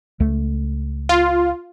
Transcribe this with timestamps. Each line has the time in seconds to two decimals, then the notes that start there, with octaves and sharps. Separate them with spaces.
0.20 C#2 A3
1.09 F4